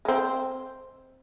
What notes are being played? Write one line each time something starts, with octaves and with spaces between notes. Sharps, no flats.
G#3 C4